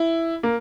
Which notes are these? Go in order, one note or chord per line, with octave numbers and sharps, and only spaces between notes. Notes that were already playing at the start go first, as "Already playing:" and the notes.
Already playing: E4
A#3